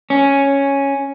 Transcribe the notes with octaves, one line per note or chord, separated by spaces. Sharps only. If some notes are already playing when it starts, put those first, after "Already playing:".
C#4